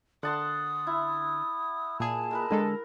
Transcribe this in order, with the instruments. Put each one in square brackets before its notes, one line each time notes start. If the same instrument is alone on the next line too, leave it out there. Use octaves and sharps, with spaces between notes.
[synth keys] D3 [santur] F#5 A5 C6 [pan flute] D#6
[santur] E4
[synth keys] A#2 G#4 [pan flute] A5
[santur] G#3 A#4 B4
[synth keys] D3 G#3 A4 [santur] A#4